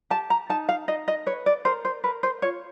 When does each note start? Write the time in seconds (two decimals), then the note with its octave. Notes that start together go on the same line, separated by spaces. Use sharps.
0.10 G4 A5
0.30 A#5
0.49 D#4 A5
0.69 F5
0.88 D#4 D#5
1.08 D#5
1.26 B4 C#5
1.46 D5
1.65 A#4 C5
1.85 C5
2.04 A#4 B4
2.23 C5
2.42 F4 C#5